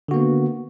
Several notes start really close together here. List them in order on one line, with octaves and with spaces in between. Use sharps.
D3 F#4 A#3 B3